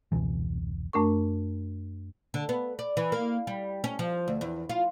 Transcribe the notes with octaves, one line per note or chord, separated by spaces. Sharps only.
F1 C#2 B2 E3
F#2 A3 D4 A#4 C#6
D3
B3
D5
E3
A#3
G3
C#4
F3
D2
E2
F4